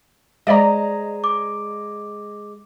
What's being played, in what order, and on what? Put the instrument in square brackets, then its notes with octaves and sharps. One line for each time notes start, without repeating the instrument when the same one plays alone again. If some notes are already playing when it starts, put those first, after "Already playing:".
[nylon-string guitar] G#3 C5 [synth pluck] D5 D#5 A#5
[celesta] D6